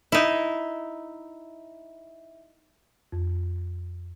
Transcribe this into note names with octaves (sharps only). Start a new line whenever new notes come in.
D#4 E4
F2